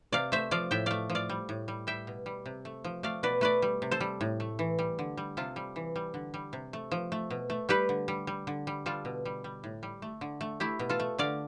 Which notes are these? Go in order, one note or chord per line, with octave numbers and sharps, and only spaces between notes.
C3 D5 F5
A3 C5 E5
F3 D5 F5
A2 E5 G5
A3 D5 F5
F3
D5 F5
G3
A2
G3
G3 E5 G5
B2
G3
C3
A3
F3
A3 D5 F5
B2 B4 D5
A3 B4 D5
G3
C3
A4 C5
G3
A2
A3
E3
G3
D3
G3
C3 F4 A4
G3
E3
G3
D3
G3
C3
A3
F3
A3
B2
A3
G3 G4 B4
D3
G3
G3
D3
G3
G3 F4 A4
B2
G3
G3
A2
G3
A3
D3
A3
A3 E4 G4
B2
F4 A4
A3
D3 D5 F5